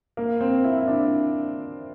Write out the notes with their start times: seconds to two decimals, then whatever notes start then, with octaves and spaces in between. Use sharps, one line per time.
0.17 A#3
0.41 C4
0.64 E4
0.81 E4
0.87 D4